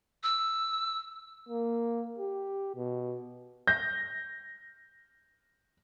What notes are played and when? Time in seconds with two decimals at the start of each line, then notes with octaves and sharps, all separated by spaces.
0.23 E6
1.49 A#3
2.19 G4
2.76 B2
3.67 G6 A#6